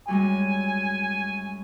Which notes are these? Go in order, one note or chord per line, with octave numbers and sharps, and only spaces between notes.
F#2 G3 G#3 G#5